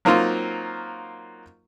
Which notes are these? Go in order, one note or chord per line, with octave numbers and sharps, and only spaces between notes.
F#3 A#3 C4 D#4 F4